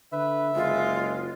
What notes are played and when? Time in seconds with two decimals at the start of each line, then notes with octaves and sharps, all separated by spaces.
0.13 D3 B4 E5
0.56 F#1 G#3 F4